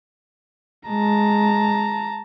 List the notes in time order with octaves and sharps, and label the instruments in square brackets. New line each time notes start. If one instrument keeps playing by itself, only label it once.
[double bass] G#3 [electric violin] A5 A#5